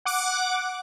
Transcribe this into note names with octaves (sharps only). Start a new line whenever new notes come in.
F#5 D6